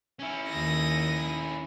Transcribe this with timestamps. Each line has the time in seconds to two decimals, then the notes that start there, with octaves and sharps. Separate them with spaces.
0.19 C#4 E4
0.49 D#2 D#6 A#6